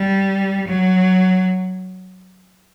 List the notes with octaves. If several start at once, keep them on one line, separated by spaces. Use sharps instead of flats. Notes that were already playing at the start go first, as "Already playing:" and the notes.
Already playing: G3
F#3